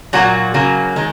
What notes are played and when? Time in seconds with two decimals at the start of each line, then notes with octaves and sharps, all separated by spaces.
0.13 A#2 F#3 A#3 F#4
0.54 C#3 F#3 A#3
0.96 D#3 G#3